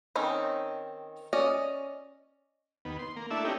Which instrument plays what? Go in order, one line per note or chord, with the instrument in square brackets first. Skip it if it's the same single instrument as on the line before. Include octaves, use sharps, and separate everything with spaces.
[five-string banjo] D#3 C4 C#4 D#4
C#4 D5 D#5
[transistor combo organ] D#2 B3
C6
A#3
A3 D4 E4 E5
A#3 C#4 D#4 E4 G4